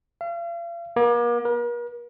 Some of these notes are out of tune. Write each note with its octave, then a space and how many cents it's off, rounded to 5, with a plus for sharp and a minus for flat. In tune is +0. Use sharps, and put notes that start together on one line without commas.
F5 -40
A#3 +40
A#4 +45